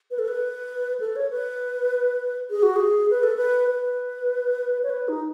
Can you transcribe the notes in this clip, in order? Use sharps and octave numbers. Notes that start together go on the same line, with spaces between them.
B4
A4
B4
A4
C#5
B4
G#4
F#4
G#4
B4
A4
B4
B4
C#5
B4
D#4